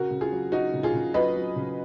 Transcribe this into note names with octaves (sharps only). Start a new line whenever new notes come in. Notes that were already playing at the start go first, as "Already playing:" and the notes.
Already playing: C#3 F#4 A#4
C#3
F4 G#4
F#3
F#3 D#4 F#4
C#3
F4 G#4
C#3
F#3 B4 D#5
F#3
C#3